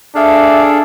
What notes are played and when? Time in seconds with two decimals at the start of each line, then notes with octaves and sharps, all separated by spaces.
0.16 D4 G#4 A4 E5 F5